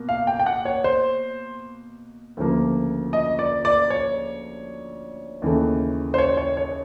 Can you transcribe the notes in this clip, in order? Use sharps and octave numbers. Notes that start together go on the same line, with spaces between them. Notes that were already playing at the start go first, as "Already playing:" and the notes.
Already playing: B2 A#3
F5
G5
G5
F#5
C#5
C5
D2 C#3 F3 A#3
D#5
D5
D5
C#5
D#2 C#3 E3 A3
C5
C#5
C#5
C#5